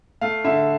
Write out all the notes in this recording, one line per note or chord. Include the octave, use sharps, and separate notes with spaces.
A3 F5
D3 E5